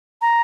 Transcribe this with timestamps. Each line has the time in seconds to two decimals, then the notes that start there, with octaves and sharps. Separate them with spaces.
0.22 A#5